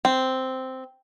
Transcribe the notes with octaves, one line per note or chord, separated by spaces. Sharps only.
C4